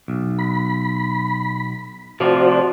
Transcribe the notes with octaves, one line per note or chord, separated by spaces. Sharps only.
B1
B5
A2 C3 F3 F#4 C5 D5